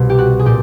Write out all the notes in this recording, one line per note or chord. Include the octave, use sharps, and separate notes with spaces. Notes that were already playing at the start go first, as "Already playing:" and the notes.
Already playing: C2 B2
G4
F#4
G#4
A#2 G3 G4